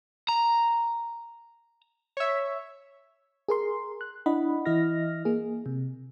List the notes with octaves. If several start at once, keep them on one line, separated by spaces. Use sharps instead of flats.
A#5
C#5 E5
G#4 A#4 C6
F#6
D4 E4 D#5 F#5 B5
E3 E4 D#5 F6 A#6
A#3 G#4
C3